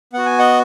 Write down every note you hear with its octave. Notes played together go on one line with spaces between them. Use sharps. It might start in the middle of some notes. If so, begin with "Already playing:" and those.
B3 F#4 F#5
G#5
D#5 F#5